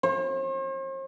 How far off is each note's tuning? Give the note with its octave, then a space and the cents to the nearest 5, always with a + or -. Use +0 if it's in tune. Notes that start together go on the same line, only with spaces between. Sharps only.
C5 +45